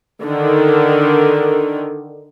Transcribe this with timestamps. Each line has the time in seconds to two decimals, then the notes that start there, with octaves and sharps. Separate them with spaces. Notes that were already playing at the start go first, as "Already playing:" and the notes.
0.23 D3 D#3